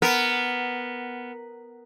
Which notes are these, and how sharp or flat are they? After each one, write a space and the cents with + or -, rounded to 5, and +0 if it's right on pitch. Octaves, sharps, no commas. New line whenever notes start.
B3 +0 A#4 +0